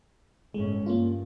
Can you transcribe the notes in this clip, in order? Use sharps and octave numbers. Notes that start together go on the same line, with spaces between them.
G1 A2 G#3 C#4
G2 A#3 C#4 F4